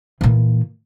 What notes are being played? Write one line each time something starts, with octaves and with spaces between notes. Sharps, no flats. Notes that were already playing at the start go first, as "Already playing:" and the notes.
A#2 E3